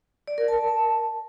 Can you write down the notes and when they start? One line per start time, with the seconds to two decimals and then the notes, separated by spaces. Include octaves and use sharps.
0.27 D5
0.38 A#4
0.48 A5